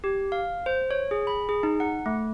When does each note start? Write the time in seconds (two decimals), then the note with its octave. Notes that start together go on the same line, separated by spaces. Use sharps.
0.04 G4
0.32 F5
0.66 C5
0.91 C#5
1.11 G#4
1.27 B5
1.49 G#4
1.63 D#4
1.80 F#5
2.06 A3